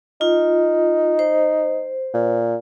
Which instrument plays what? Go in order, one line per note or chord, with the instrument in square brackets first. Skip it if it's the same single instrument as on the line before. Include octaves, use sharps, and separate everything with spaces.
[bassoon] D#4 [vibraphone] F4
[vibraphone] C5
[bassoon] A#2